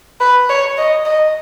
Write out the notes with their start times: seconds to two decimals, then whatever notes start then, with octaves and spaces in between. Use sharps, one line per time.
0.20 B4
0.49 C#5
0.77 D#5
1.05 D#5